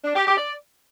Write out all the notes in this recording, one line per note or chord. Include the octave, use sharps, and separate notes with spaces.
D4
G4
G4
D5